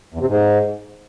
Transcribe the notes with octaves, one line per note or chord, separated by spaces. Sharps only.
E2
C3
G#2